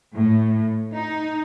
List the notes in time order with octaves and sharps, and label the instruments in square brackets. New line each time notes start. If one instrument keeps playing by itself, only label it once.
[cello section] A2
D#4